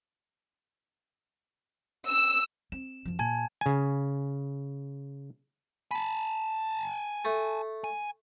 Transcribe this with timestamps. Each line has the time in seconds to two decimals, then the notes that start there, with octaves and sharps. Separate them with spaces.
2.07 E6
2.72 C4 E7
3.05 F#2 F3
3.19 A#2 G#5 A5 G#6
3.61 C#3 G#5
5.91 G#5 A5 B5
7.25 A3
7.84 G#5